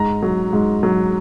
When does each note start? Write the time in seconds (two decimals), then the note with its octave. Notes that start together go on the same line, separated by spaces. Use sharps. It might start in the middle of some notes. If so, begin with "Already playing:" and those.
Already playing: G#2 A#5
0.23 F#3
0.53 G#2
0.83 F#3